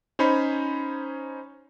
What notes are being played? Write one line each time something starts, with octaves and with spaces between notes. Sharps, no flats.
C#4 D#4 C5 C#5 B5